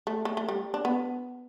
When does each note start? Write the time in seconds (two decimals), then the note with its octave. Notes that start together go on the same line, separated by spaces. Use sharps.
0.07 A3
0.25 A3
0.37 A3
0.49 G3
0.74 D4
0.85 B3